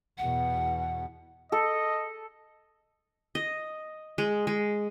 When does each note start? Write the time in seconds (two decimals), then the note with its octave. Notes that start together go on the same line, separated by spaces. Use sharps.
0.18 E2 B2 F#5
1.52 A4 D#5
3.35 D#5
4.18 G#3
4.47 G#3